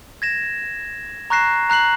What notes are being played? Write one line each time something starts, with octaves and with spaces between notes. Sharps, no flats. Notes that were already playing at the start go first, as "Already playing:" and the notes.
G#6 A#6 E7
A#5 C#6 F#6 A#6 C7 E7
A#5 F#6 C7 F#7